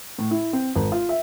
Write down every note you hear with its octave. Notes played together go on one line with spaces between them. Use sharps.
A2
E4
C4
G#1
F4
E5